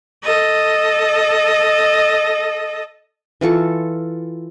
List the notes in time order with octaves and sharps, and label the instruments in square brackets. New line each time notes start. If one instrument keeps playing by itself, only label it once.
[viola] A4 D#5
[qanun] E3 F4 A4 C#6